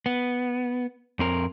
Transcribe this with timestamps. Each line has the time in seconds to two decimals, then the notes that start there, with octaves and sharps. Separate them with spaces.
0.06 B3
1.19 F2 C4 A#4